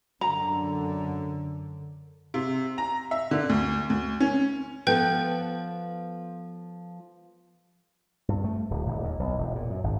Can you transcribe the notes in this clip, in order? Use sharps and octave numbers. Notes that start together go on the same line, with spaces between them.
F#2 D3 A#5
C3
A#5
E5
D3
D2
D2
C#4
F3 B3 A4 B4 G5 G6
G2
A3
D1
D#1
D#2
B1
E1
A#2
F#2
G#1